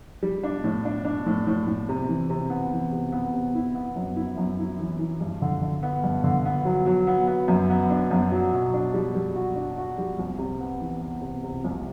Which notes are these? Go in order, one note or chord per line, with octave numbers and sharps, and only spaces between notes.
G3
D4
A2
D4
D4
A2
A2
A2
C3
E3
C3
B3
E3
C3
B3
C3
E4
B3
F#2
E4
F#2
E4
E3
E3
G2
D3
D3
B3
G2
D3
B3
F#3
F#3
B3
B3
F#2
B3
D4
F#2
F#3
B2
D4
G3
G3
F#4
D4
F#4
G3
C2
C3
B3
E3
B3
C3
C3
C2